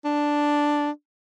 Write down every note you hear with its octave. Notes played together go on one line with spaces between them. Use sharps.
D4